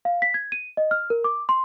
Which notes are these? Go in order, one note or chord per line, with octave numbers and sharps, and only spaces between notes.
F5
B6
G#6
D#7
D#5
F6
A#4
D6
C6